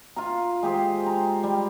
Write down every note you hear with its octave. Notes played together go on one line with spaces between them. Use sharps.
F4 F5 A#5
G#3 G4 G#4 C5
A#5
G3